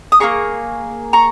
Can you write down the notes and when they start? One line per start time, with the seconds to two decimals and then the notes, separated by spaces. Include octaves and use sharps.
0.12 D#6
0.20 A#3 F4 G#4 A#5 C#6
1.13 A#5 C#6